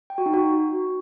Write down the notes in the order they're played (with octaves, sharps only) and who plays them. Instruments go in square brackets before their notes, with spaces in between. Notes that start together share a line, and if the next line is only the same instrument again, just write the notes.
[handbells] G5
F#4
D#4
F#4